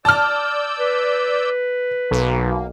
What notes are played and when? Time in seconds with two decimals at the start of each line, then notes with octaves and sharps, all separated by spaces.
0.05 D5 A5 E6 F6 G6
0.79 B4
2.11 B1 A#3